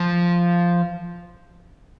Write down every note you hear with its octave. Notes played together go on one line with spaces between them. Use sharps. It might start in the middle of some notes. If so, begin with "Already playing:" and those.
Already playing: F3